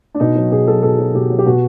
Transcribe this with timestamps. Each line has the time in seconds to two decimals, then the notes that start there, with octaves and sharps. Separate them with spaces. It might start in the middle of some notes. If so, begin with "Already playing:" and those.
0.15 D4
0.20 B2 D#4
0.35 F#3
0.51 B2 G#4
0.67 F#3 A4
0.83 B2 A4
0.98 F#3
1.14 B2 G4
1.30 F#3
1.38 G4
1.46 B2 F#4